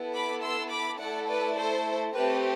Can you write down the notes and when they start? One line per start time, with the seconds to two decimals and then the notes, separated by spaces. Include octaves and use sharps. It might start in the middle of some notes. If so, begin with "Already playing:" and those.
Already playing: B3 E4 A4
0.14 B5 D6
0.42 C6 E6
0.71 B5 D6
1.00 A3 E4 A4 D5 F#5
1.28 B4 D5
1.56 A4 C5
2.14 A3 C4 G4 B4